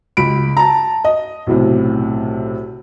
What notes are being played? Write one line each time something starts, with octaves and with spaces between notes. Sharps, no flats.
C#2 B5 D7
A5 A#5
D#5
B1 A2 C3